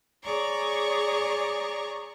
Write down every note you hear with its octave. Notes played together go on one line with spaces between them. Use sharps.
G#4 C#5 D5 A#5 C#6 D6